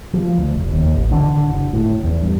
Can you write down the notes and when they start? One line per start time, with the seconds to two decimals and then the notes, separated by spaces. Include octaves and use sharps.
0.13 F3
0.38 D2
0.55 F1
0.72 D#2
0.95 A1
1.11 D3
1.48 F#1
1.73 A2
2.04 E2
2.22 G2